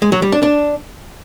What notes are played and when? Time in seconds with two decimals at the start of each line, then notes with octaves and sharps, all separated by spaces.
0.02 G#3
0.12 F#3
0.22 G3
0.32 D4
0.43 D4